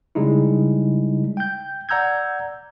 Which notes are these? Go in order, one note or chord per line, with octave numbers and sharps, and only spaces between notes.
C#3 G3 G#3 D#4 E4
G5 G6
D5 F#5 A#5 E6 G6 G#6